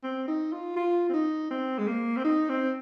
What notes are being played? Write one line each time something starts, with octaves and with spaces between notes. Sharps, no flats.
C4
D#4
F4
F4
C4
D#4
C4
G#3
A#3
C4
D#4
C4